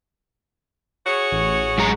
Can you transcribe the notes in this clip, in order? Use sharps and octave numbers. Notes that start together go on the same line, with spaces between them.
F#4 G#4 C#5
A1
F#2 G#3 A#5